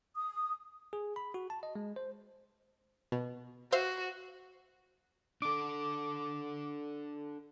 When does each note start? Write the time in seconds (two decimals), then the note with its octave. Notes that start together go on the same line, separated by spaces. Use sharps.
0.16 D#6
0.93 G#4
1.16 B5
1.34 F#4
1.50 A5
1.63 D#5
1.75 G#3
1.96 C5
3.12 B2
3.72 F#4 C5 E5 F5
5.42 D4 A4 D6